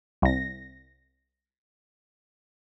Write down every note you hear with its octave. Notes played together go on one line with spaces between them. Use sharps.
C2 A#6